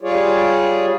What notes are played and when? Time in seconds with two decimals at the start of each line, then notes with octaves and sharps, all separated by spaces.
0.01 G3 F4 G#4 C#5 D5